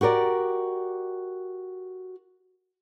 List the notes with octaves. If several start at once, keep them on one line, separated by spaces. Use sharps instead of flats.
F#4 G4 A#4 D5